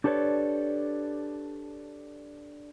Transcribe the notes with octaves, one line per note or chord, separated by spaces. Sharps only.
D4 G4 A4 B4 C#5 D5